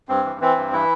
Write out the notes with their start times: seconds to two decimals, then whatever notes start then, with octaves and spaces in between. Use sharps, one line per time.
0.09 G2 C4
0.25 E3
0.41 E3 C4
0.57 G2
0.73 E3 E4